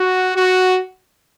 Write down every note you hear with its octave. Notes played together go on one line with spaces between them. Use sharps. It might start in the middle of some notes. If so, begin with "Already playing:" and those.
Already playing: F#4
F#4